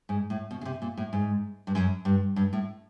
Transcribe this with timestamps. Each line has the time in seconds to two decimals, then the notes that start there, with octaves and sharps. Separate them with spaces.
0.09 G#2
0.30 A2
0.51 B2
0.61 C#3
0.65 C3
0.82 A#2
0.97 A2
1.13 G#2
1.67 G2
1.75 F#2
2.05 G2
2.36 G2
2.53 A2